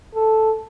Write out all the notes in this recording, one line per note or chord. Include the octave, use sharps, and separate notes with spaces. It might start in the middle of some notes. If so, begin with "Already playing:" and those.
A4